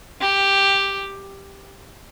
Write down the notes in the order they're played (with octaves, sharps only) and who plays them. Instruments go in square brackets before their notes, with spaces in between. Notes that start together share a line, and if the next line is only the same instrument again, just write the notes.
[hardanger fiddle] G4